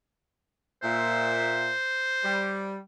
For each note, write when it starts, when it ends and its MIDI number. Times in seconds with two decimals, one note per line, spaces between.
0.83 1.72 46
0.83 2.74 72
0.83 1.72 76
2.23 2.78 55